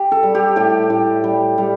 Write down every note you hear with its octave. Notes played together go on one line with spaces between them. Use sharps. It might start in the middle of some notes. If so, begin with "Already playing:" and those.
Already playing: G4
A4
G3
G4
A2 G4
A2
G3
G3